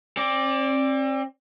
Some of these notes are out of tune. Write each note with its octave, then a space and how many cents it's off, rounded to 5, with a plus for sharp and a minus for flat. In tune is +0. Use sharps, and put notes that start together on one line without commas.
C4 +40 D5 +0